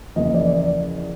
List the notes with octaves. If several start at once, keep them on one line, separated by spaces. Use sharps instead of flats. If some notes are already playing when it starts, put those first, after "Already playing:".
E2 C#3 F3 A#3 D#5
D5
D5